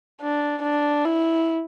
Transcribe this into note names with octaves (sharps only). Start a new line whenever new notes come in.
D4
D4
E4